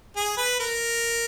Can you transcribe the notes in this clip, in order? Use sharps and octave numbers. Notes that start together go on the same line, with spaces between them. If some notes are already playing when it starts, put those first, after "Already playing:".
G#4
B4
A#4